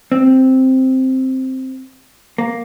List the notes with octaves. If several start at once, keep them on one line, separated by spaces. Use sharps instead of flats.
C4
A#3